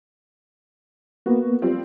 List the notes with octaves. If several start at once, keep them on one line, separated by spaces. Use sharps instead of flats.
A#3 B3 F#4
F3 G3 C4